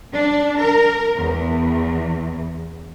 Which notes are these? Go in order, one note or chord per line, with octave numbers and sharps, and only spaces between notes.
D4
A#4
E2